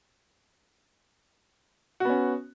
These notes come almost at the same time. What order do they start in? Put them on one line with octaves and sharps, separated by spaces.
F#4 B3 C#4